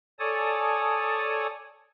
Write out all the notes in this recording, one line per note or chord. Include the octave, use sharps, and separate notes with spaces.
A4 C#5 D5 G#5 A5 D#6